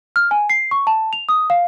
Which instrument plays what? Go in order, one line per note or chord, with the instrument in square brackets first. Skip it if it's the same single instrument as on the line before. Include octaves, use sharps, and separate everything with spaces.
[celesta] F6
G#5
C7
C#6
A5
F7
D#6
F5